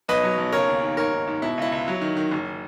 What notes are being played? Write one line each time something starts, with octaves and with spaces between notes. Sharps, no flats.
B1 B4 D#5
F#3
B1
C#3 A#4 C#5
D#2
D#2
G#2 A#4 C#5
G#2
G#2
B2 E4
C#2 E4
C#2
F#3
D#3
D#3
F#1